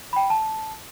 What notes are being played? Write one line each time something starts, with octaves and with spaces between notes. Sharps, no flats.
G5 B5
A5